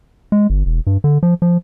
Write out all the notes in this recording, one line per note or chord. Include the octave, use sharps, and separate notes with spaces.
G#3
G1
E1
G2
D3
F3
F3